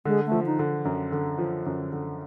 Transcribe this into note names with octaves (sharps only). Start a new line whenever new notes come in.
D3 G#3
A3
F3
D#4
D3
F#2
D3
F3
F#2
D3